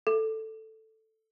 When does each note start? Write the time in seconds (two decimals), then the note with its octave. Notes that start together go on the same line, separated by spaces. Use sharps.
0.07 A4